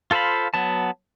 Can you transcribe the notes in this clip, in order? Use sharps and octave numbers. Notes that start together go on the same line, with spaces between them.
F4 A4 C5 F5 B5
F#3 B3 A5